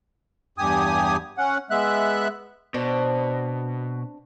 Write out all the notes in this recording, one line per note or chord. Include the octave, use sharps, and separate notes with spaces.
E2 G2 G4 G#5 D#6
C#4 F#5
G#3 B3 E5 F#6
B2 C4 D4